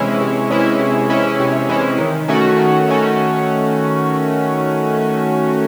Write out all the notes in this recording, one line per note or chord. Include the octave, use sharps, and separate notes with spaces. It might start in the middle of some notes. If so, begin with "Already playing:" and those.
Already playing: C3 E3 G#3 C#4 E4
C3
E3 G#3 C#4 E4
C3
E3 G#3 C#4 E4
C3
E3 G#3 C#4 E4
D#3
A3 C#4 F#4
D#3
A3 C#4 F#4